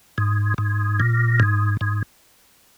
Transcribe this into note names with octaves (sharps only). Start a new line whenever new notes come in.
G#2
G#2
A#2
G#2
G#2